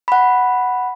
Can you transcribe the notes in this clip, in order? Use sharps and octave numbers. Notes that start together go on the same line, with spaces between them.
F#5 B5